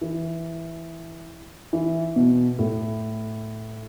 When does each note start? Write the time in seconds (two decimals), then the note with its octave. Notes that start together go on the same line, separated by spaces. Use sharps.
0.01 E3
1.73 E3
2.16 B2
2.59 A2